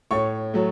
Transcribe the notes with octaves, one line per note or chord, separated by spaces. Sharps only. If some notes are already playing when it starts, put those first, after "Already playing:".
A2 C#5 C#6
F#3 A3